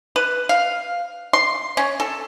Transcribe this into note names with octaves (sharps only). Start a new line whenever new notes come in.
B4
F5
C6
C#4
A4